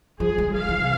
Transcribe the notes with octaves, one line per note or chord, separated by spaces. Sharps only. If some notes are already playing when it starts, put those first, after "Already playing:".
F3 G#4
G#3
F3 F5
E3
C3